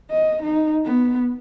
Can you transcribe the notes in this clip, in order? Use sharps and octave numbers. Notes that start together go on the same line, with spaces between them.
D#5
D#4
B3